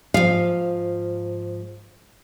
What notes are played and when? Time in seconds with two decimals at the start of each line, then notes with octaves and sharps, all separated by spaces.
0.14 G#2 F3 F5